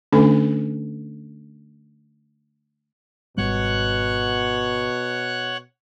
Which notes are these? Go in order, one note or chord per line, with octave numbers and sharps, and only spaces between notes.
D3 A3 C#4 D4 A4 G#5
G#1 B2 G3 B3 C#5 F#5 F#6